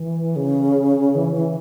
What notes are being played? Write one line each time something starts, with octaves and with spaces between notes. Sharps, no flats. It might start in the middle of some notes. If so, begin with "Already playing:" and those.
Already playing: E3
C#3
E3
E3